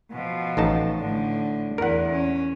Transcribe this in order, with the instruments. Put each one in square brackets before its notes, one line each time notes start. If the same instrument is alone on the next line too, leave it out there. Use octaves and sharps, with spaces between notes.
[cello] B2 F3
[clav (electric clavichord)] A1 D#4 A5
[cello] A2 D3
[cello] E2 [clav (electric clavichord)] A#4 F#5
[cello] C#4